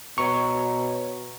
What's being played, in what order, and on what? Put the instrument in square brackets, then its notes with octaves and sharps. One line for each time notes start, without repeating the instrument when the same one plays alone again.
[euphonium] B2 [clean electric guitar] C#5 A#5 [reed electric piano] C#6